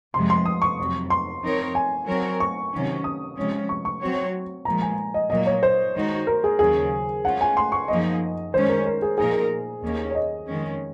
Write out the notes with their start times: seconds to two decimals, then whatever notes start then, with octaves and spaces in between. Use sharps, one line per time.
0.14 F2 C3 F3 G#3 C6
0.30 C6
0.45 D#6
0.62 C#6
0.78 F2 C3 F#3
1.10 C6
1.44 F3 C4 D#4 A#4 C#5
1.75 G#5
2.07 F#3 C4 F#4 A#4 C#5
2.40 C#6
2.73 C3 D#3 F#3 C#4
3.04 D#6
3.37 C3 F3 G#3 C#4
3.69 C#6
3.85 C#6
4.02 F#3 C4 F#4 C#5
4.65 A#2 F3 G#3 A#5
4.82 G#5
5.14 D#5
5.30 A#2 F#3 A#3 D#5
5.47 C#5
5.63 C5
5.94 D#3 G#3 D#4 F#4
6.27 A#4
6.44 G#4
6.59 D#2 C#3 F#3 G#4
7.25 G#3 C#4 F4 F#5
7.41 G#5
7.57 C6
7.72 C#6
7.88 F#2 F3 A#3 D#4 G#4 D#5
8.53 D#3 G#3 C#4 C5
8.69 A#4
8.86 A#4
9.02 G#4
9.18 A#2 F3 A#3 D#4 G#4 A#4
9.33 G#4
9.82 D#2 D#3 A#3 C#4
10.11 C#5
10.15 D#5
10.47 F2 D#3 G#3 C#4